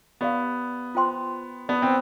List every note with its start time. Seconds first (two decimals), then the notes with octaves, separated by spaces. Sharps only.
0.21 B3 G4 D5 F5
0.95 F4 C5 G5 C6
1.69 B3 G4 D5 A5
1.82 C4